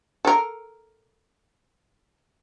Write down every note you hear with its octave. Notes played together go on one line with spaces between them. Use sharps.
A4 A#4